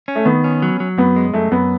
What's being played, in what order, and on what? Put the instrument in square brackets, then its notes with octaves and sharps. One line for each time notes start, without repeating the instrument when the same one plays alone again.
[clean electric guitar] C#4
[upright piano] A3
[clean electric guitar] D#3 [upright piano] B3
[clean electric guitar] C#4
F#3
F#3
[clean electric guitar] F#2 [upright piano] B3
[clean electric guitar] G#3
[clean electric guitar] F#2 [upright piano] A3
[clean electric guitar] F#2 [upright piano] B3